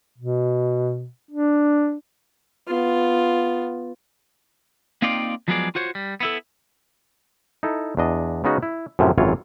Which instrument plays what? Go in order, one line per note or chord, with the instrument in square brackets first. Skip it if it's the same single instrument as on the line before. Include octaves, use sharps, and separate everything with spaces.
[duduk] B2
D4
[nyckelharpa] B3 F4
[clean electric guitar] A#3 C4 D#4 F4 D5 G5
F3 F#3 G#3 B3 G#4 D5
F4 F#4 C5 C#5
G3
B3 E4 A4
[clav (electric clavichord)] D#4 E4 A4
E2 D4 D#5
C#3 G#3 B3 C#4 D#4 F#4
E4
F#2 A2 C3 F3 C#4
G#1 F#2 C3 E3 F4 C#5